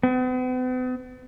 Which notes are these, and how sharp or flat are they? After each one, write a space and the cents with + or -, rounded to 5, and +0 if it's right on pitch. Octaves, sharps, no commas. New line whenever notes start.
B3 +45